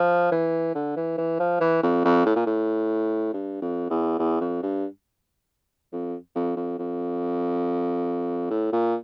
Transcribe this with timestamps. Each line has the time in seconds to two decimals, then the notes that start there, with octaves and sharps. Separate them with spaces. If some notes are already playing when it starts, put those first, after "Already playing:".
Already playing: F3
0.32 E3
0.75 D3
0.97 E3
1.18 E3
1.40 F3
1.60 E3
1.83 F2
2.05 F2
2.26 A2
2.36 A#2
2.47 A2
3.34 G2
3.62 F2
3.90 E2
4.19 E2
4.41 F2
4.63 G2
5.93 F2
6.35 F2
6.57 F2
6.79 F2
8.50 A2
8.73 A#2